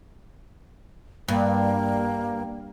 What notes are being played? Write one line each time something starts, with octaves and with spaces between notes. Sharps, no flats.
G2 A#3